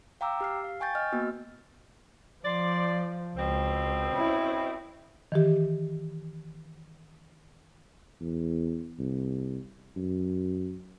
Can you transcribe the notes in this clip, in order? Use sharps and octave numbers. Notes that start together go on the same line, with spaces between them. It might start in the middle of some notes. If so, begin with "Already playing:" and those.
F5 G5 A#5 D6 E6
G4 F6 C7
F5
G5 G#5 C#6 G6 A6
D#5 F6
A#3 B3 F#4
F3 C5 D5
C#2 B2 C4
C#4 E4
D#3 E3 G4
E2
C2
F#2